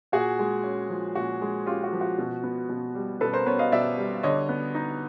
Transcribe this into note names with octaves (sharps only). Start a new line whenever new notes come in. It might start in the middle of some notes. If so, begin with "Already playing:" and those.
A#2 F#4 G#4
G#3
C#4
F3
A#2 F#4
G#3
C#4 F4 G4
F#4
F3
F#4
B2
B3
B2
G3
B2 A4 B4
A#4 C5
B3 B4 C#5
D#5 F5
B2 D5 E5
G3
D3 C#5 D#5
B3
D#4